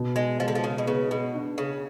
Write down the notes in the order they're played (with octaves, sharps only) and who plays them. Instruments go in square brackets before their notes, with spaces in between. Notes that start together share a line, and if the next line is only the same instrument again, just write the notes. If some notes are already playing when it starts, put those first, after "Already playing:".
Already playing: [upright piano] B2
[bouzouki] G#3
[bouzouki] F3 [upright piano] G#3
[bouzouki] D3
F3
C#3
B2
[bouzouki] C#3 [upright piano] B3
[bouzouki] B2
[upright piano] D4
[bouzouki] C#3